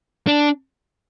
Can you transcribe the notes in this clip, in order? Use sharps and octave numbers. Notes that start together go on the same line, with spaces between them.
D4